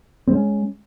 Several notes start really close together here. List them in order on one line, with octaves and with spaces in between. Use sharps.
C4 G#3 C#4